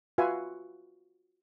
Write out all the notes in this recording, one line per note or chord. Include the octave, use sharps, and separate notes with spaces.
F4 F#4 B4 E5 F5 G#5